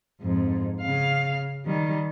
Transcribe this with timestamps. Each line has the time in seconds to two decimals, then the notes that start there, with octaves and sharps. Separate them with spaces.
0.21 F2 G#2
0.81 C#3 F5
1.65 D#3 G3